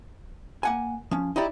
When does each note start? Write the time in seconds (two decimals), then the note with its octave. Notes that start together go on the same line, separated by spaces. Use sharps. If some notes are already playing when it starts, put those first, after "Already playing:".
0.63 A#3 F#5 G#5
1.11 F3 C#4
1.36 D#4 E4 G4 D5